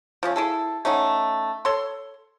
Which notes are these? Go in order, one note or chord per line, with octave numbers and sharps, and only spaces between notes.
F3 A3 C#4
E4 G#4 A4
A3 C#4 D#4 F#5
A4 C#5 C6